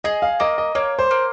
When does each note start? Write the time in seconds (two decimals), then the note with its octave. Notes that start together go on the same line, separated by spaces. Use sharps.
0.04 G#4 D#5
0.22 F5
0.40 A#3 D#5
0.58 D#5
0.75 A#3 C#5
0.99 C5
1.11 A#3